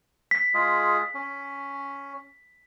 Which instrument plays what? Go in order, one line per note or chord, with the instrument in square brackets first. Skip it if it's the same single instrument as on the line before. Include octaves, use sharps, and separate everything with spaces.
[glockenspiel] B6
[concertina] G#3 F4 G#4
C#4